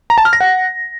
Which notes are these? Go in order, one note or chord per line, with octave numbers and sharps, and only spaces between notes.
A#5
A5
F6
A#6
F#5